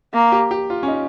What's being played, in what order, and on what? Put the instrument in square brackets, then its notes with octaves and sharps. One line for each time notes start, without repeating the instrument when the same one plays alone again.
[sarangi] A#3
[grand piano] G4
G4
F4
C#4
D#4